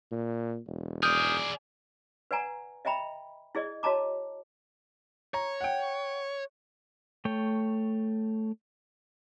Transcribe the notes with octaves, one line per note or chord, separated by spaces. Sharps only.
A#2
E1
G#4 D5 D#6 F6 G6
B4 D5 F#5 G#5 A#5
D#5 E5 G5 A#5 B5
E4 G#4 D5 D#5
F#4 C#5 D#5 A5 A#5 D6
C#5 A#5
F#5 G5
A3 C#5 G5